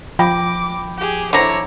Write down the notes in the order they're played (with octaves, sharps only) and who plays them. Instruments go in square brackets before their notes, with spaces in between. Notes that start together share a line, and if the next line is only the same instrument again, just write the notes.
[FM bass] F3 [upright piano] G5 B5 A#6 [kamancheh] D6
[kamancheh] G4 G#4
[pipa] D3 A#5 [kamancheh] E4 C#5 [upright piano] C5 D6